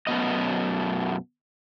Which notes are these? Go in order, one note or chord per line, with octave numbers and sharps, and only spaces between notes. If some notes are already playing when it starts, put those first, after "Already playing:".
F#2 B2 A3 B3 D#5